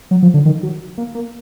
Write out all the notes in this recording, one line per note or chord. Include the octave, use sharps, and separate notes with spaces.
F#3
F3
D3
D#3
F#3
A#3
A#3